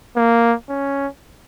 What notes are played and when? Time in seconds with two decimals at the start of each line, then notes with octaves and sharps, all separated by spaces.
0.16 A#3
0.69 C#4